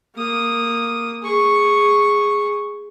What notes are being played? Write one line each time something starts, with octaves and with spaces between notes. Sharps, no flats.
A#3 D#6
G#4 C#6